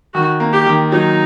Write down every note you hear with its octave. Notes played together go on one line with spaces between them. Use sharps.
D#3 F#4
A#3
G4
D#3
F#3 D#4